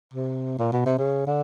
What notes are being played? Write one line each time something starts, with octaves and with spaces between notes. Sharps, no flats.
C3
A#2
B2
C3
C#3
D3